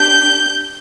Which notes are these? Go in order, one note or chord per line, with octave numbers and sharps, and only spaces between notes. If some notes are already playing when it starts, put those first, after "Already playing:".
Already playing: D4 G4 G6